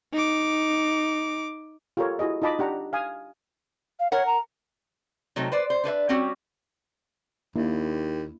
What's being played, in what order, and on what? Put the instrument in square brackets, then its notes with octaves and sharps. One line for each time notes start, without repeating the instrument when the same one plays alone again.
[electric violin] D#4 D6
[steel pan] F4 G4 A4 A#4 C#5
E4 F#4 G#4 D#5
D#4 F4 D#5 A5 B5 D6
D4 G4 F#5 A#5
F5 G#5 D#6
[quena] F5
[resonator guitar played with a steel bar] A#4 F#5 [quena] C#5
[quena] A#5
[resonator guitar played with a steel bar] C3 F#3 A3 C4 D#4
B4 C5 D5
C5
D4 B4 C5 E5
G3 C4 C#4 F#4 G4
[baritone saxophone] D#2 [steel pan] A#3 D4 E4